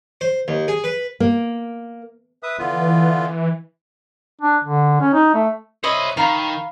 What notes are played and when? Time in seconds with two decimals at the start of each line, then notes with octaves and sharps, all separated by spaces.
0.21 C5
0.48 D#2
0.68 G#4
0.84 B4
1.20 A#3
2.43 B4 E5 D#6
2.59 D3 E3 B3 F4
4.42 D4
4.64 D3
5.01 C#4
5.14 D#4
5.35 A3
5.84 C5 C#5 D#5 E5 B5
6.17 D#3 F5 A#5 B5